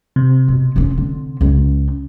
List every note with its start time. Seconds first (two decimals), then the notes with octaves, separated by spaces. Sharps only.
0.16 C3
0.48 B2
0.76 E3 C#4
0.98 D3
1.41 C#2 C#4